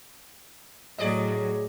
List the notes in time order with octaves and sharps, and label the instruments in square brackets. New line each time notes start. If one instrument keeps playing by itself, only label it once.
[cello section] A2 F#3 [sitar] G#4 D5 D#5